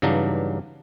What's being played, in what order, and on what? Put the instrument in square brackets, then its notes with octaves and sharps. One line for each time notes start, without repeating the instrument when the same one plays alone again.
[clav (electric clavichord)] G2 C#3 E3 F#3 D4 D#4